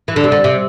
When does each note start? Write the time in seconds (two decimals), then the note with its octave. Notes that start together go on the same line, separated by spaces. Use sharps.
0.08 E3
0.16 D3
0.24 C3
0.32 D3
0.44 C3